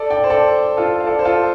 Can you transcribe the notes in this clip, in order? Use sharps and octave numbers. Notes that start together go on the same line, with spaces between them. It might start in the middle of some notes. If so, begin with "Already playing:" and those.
Already playing: A4 D5
D5 G5
C5
A4 D5
F4 A4
F5
A4 D5
C5
F4 A4